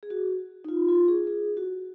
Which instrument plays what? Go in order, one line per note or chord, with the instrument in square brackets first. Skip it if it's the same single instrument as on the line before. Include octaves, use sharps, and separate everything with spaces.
[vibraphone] G#4
F#4
D#4
F4
F4
G#4
G#4
F#4